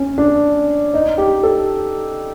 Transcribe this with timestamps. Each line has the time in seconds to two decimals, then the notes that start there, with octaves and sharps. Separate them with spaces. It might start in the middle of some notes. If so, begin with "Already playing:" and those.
Already playing: C#4
0.18 D4
0.94 D#4
1.18 G4
1.43 A4